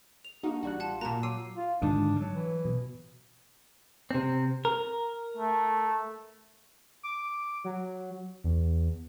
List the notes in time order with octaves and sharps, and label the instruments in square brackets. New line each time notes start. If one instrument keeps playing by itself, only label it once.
[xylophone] F7
[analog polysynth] A#3 D#4 F#4 [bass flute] D4
[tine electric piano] A1 G3 F#6 [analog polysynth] F#4
[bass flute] F4 [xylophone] F#5 A5
[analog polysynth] A#2 F#4 [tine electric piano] A#3 [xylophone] A5 A#5
[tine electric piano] F#3 D6 [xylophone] E6 C7 D#7
[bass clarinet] F4
[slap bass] G#2 D3 D#3 [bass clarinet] D4
[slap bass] F#3 G3
[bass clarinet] E3
[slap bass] B2
[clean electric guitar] C3 C4
A#4
[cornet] A3
[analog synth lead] D6
F#3
[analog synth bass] E2